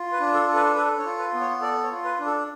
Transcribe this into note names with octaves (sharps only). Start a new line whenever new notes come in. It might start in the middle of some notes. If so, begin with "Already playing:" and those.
Already playing: F4
B4
D4
A4
A4
B4
A4 B4
C#5
F4
B4
B3
C#5
A4 D5
C#5
F4
B4
D4
A4